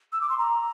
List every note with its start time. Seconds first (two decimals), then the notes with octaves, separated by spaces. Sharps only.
0.13 E6
0.21 D6
0.29 C6
0.38 A#5